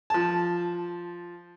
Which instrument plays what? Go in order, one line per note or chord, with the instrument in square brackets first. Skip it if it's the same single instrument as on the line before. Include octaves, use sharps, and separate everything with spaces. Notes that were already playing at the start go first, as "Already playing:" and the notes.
[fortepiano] F3 A5